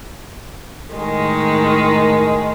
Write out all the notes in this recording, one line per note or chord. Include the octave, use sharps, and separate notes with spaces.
A2 D#3 G#3